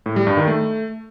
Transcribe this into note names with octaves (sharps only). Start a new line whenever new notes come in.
A2
G3
G2
D#3
A3